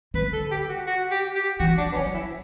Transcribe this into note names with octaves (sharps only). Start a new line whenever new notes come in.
D3 B4
A4
G4
F#4
F#4
G4
G4
E3 F#4
D4
B3
F#3 C#4
E4